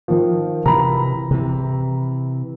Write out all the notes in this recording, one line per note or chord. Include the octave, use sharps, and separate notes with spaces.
D#3 F3
C3 E3 A#5 B5
C3 E3